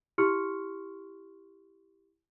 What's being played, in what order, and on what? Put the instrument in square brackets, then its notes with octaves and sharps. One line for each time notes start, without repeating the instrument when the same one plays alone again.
[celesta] E4 G4 C6 C#6 F6 C#7